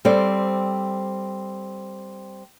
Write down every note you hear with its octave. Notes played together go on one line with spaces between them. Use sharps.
G3 C4 A4 C5 D5